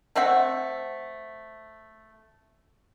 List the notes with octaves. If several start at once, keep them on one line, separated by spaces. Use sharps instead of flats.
A3 C4 E5 F#5